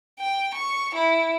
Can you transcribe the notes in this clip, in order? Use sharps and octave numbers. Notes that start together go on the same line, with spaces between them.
G5
C#6
E4